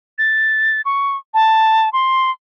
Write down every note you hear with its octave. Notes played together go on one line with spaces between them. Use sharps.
A6
C#6
A5
C6